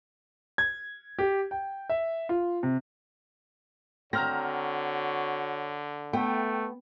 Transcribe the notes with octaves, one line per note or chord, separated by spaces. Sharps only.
G#6
G4
G5
E5
F4
C3
D3 C4 F#4 C#5 A#5 F6 A#6
A3 B3 G5